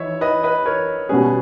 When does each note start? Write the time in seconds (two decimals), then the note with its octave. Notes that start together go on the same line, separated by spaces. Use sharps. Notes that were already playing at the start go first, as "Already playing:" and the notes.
Already playing: E3 D#4 C#5 E5
0.21 B4 D#5
0.43 B4 D#5
0.66 A#4 C#5
1.09 B2 G3 C#4 G#4 B4